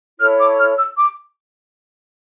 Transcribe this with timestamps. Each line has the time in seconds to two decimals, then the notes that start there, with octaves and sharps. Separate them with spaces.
0.19 E4 A4 C#5 F6
0.39 D6
0.58 F6
0.77 E6
0.97 D6